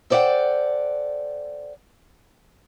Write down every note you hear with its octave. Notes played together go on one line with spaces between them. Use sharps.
A4 C5 D5 D#5 F#5 G5